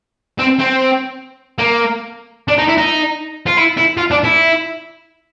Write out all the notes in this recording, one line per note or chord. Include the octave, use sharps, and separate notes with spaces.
C4
C4
A#3
D4
D#4
E4
D#4
F4
E4
E4
F4
D4
E4